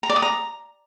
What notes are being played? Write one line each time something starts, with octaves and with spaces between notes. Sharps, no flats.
A#5
D5
D#6
A#5